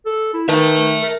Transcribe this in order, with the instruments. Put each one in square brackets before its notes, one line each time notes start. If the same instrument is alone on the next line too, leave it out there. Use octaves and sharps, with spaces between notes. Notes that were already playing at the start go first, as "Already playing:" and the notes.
[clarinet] A4
E4
[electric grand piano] D#3 [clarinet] B4 [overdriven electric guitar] E5 A5
[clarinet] A#4